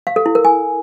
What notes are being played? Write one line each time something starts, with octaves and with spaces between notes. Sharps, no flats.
F5
A4
E4
A#4
G#5